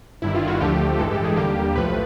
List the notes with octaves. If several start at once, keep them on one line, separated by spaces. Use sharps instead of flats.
G1 G2 D#3 E4
F4
F#4
D2 D3 F3 A3 G4
A1 G2 E3 G#3 A4
G4
G#4
D#2 D3 G3 A#3 G4
B1 A2 F3 A3 B4